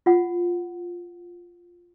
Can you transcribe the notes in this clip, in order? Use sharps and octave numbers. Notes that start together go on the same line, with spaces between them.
F4 F#5